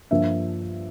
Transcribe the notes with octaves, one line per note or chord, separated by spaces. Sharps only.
G2 F3 A#3 D4 E5